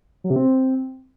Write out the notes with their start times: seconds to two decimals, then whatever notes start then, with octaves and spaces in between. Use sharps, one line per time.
0.24 F#3
0.30 C3
0.36 C4